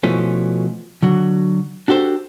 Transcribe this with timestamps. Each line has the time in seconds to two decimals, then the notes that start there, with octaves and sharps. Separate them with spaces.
0.03 B2 E3 F3 A3 C#4
1.03 D3 F#3 F#4
1.88 D4 F#4 G4 A4 C5